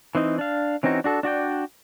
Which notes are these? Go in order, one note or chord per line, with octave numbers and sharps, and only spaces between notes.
E3 C4 D#4
D4 F5
E3 C4 C#4 D#4 F#4
D4 F#4 A4
D4 F#4 D5 G5